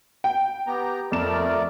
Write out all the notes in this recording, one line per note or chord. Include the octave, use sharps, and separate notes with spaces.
G5
B3 G4 A#5
F2 A3 A#4 D5 E7